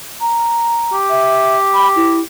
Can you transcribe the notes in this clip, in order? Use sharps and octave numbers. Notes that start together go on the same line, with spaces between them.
A#5
G4
E5
B5
E4